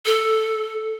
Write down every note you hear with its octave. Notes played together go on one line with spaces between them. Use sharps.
A4